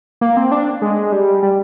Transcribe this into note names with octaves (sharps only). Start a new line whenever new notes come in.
A#3
C4
D4
G#3
G3
G3